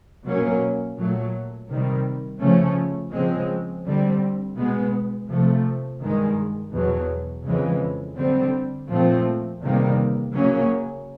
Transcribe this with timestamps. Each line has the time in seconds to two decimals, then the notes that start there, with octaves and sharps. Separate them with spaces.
0.24 B2 F#3 A#3 C#4
0.96 A#2 F#3 A3
1.68 C3 D#3 G3
2.40 C#3 F3 A3 C#4
3.12 C#3 F3 G#3 C4
3.84 D3 G3 C4
4.56 B2 G#3 B3
5.29 C3 F3 A3
6.01 G2 D#3 G#3
6.72 E2 B2 F#3
7.45 F2 C#3 E3 G#3
8.16 D3 G3 C4
8.88 A#2 F3 A3 C4
9.61 E2 C3 D#3 G3 A#3
10.33 C#3 F#3 A#3 C#4